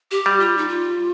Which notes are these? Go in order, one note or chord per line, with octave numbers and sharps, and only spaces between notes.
G4
G3
F4
D#4
F4